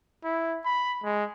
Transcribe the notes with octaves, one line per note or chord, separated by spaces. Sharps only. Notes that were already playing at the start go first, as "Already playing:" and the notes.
E4
B5
G#3